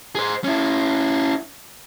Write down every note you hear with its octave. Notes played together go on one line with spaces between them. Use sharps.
G#4 C5
C#4 E4